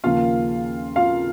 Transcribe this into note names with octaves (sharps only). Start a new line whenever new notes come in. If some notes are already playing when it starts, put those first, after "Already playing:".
D#2 C#3 F3 A#3 F4 F5
F4 F5